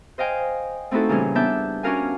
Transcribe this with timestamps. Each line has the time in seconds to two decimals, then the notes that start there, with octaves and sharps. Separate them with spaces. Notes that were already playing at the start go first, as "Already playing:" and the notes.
0.18 C5 D#5 F5 G5 G#5
0.91 A3 C4 D#4 E4 F#4 A4
1.09 A#2 C#3 E3 G3 C#4
1.35 B3 D4 E4 E5 A5 G6
1.83 C#4 D4 F#4 A#4 F5 G#5